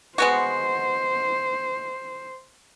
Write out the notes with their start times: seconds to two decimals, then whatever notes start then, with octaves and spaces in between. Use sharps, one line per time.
0.18 G#3 B3 F#4 C5